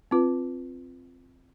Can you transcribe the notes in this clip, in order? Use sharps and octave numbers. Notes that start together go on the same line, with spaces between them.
C4 F4 B4